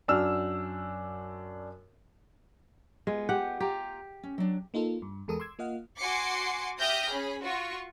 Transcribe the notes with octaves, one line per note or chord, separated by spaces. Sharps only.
F#2 D4 F#4 E6 F6
G#3 B3 F4
G4 F#5 G5
F4 G4 G5 A#5
C#4
F#3 D4
A#3 D#4 F4 A4
G2
E2 G#3 A4 A#4 D#6
C6 D6 E6 G#6
A#3 F4 D#5 F5 F#5
F#4 G#5 C6 D6 C7 C#7
G4 E5 D#6 F6 G6 A#6
C#4 G#4 B5
F4 F#4 C#6